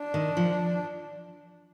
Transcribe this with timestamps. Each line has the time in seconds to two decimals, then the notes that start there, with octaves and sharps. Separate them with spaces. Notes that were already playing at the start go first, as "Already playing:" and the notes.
Already playing: D4
0.14 D#3
0.37 F3